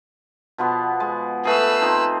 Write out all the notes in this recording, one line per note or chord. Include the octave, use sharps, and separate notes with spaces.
B2 F3 B3
G#3
A3 G#4 B4 E6
F3 C4 D#4